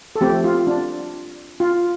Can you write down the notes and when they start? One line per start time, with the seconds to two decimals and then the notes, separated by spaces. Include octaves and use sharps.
0.16 A4
0.21 F3 A3 C4 G4
0.44 F4
0.67 D4
1.60 F4